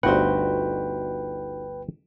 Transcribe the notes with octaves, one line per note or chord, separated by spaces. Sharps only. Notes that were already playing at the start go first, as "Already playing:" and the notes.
G1 D2 D#4 F#4 B4 C5 F#5 G5